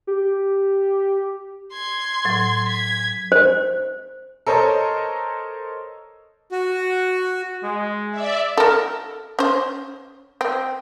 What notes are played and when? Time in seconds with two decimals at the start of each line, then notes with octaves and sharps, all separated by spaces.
0.07 G4
1.73 C6 G#6
2.25 A2 F#3
2.68 G#6 B6
3.32 C5
4.47 A4 A#4 C5 C#5 D#5
6.52 F#4
7.63 G#3
8.11 D5 E5
8.57 A4 A#4
9.39 C#4 C5
10.41 C4